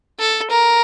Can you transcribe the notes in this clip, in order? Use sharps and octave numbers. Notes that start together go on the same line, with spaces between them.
A4
A#4